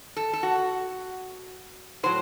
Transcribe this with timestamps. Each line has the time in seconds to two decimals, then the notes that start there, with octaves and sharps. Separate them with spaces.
0.16 A4
0.33 A4
0.43 F#4
2.03 A2 F#3 C5